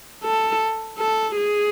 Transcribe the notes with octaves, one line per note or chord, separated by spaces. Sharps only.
A4
A4
G#4